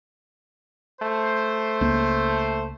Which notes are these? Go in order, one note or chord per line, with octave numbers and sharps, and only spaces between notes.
A3 C5
C#2 A#3